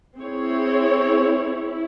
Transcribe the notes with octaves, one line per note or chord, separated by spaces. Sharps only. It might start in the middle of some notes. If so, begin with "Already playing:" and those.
C4 E4 G#4 C#5
E4